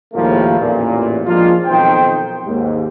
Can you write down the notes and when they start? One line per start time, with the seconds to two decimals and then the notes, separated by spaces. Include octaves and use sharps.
0.13 D#2 A2 F3 G3 G#3 A#3
0.58 A1 E2 A#2
1.25 F3 G#3 A#3 D4 F4
1.66 B1 F2 D#3 C5 G5
2.45 D#2 G#2